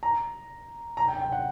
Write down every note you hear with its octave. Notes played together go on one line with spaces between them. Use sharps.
A#5
A#5
G5
G5
F#5